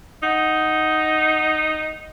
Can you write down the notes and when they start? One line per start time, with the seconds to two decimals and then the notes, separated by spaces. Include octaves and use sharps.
0.23 D#4 F#5